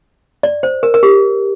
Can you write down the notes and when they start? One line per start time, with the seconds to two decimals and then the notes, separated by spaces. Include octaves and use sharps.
0.43 D5
0.63 C5
0.83 A#4
0.94 A#4
1.03 G4